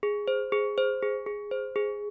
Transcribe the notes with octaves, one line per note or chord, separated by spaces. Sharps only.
G#4
C5
G#4
C5
G#4
G#4
C5
G#4